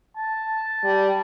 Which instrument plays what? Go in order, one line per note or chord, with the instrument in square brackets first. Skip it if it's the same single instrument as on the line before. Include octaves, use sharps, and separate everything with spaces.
[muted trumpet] A5
[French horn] G3